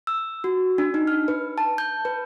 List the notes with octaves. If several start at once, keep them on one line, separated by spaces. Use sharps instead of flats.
E6
F#4
D4
D#4
F6
B4
A5
G6
B4